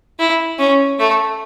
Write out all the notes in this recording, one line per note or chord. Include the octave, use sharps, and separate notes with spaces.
E4
C#4
A3